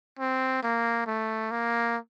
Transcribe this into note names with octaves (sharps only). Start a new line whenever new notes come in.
C4
A#3
A3
A#3